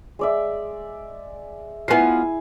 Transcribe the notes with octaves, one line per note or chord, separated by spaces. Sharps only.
G#3 D5 E5
F3 B3 E4 G#5 C7